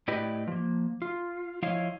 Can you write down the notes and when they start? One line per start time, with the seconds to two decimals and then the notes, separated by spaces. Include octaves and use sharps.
0.08 A2 E4 G4 B4 D5 D#5
0.48 F3 A#3
1.02 F4
1.62 F3 E4 C#5 D#5 F5